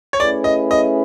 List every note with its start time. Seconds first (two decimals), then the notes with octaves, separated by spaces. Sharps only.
0.13 C#5
0.19 A3 C#4 E4 G#4 B4 D5
0.44 D#5
0.71 D#5